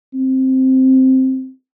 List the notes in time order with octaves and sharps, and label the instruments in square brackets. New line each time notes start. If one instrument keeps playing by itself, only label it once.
[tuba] C4